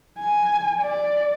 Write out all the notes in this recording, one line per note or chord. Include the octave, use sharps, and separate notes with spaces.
G#5
D5